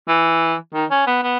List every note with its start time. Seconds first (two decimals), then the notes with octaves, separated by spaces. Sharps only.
0.08 E3
0.74 D#3
0.91 C#4
1.07 B3
1.23 B3